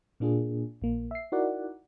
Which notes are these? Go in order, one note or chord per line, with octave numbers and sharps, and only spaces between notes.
A#2 A#3 D4 F4 G#4
A#1 A#3
E5 C7
D#4 E4 F#4 A#4 D5 F#5